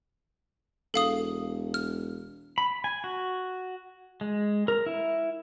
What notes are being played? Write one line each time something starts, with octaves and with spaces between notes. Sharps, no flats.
E1 A4 F5 D#6
F6
B5
G#5
F#4
G#3
A#4
E4